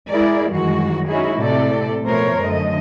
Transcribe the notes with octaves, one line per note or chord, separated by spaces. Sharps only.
G#3 E4 G#4 A#4 D5
F#2 D#3 E3 G3 G#3 F#4
C#4 D#4 E4 F#4 G#4
A2 C3 A4 D5
B2 F3 A3 A#4 C5 C#5
F#2 D3 A3 D#5